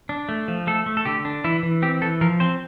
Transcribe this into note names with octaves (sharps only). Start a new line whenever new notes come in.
D4
A3
F3
A3 A4
A3
A4
D3 G4
D4
E3 E4
E3
C4 G4
E3 A4
F3 A#4
C4 C5